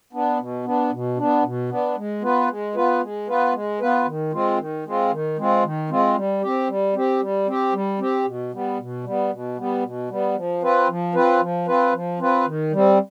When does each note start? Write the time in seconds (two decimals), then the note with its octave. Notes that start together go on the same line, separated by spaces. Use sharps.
0.13 B3 D4
0.39 B2
0.65 B3 D4
0.92 B2
1.17 B3 D4
1.43 B2
1.69 B3 D4
1.96 G#3
2.22 B3 F4 B4
2.49 G#3
2.75 B3 F4 B4
3.01 G#3
3.28 B3 F4 B4
3.53 G#3
3.80 B3 F4 B4
4.06 D#3
4.32 G#3 C4 F4
4.58 D#3
4.85 G#3 C4 F4
5.11 D#3
5.37 G#3 C4 F4
5.64 D#3
5.90 G#3 C4 F4
6.16 G3
6.42 C4 G4
6.68 G3
6.95 C4 G4
7.21 G3
7.47 C4 G4
7.73 G3
7.99 C4 G4
8.25 B2
8.52 G3 B3
8.79 B2
9.04 G3 B3
9.31 B2
9.57 G3 B3
9.83 B2
10.10 G3 B3
10.36 F3
10.62 C4 F4 B4
10.89 F3
11.14 C4 F4 B4
11.40 F3
11.68 C4 F4 B4
11.93 F3
12.19 C4 F4 B4
12.46 D#3
12.72 G3 C4